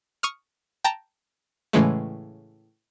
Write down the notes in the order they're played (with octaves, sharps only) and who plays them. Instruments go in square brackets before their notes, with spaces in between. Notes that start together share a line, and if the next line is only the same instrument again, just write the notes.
[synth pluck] C#6 D#6 F6
G5 A5 A#5
A2 C#3 E3 G#3 A3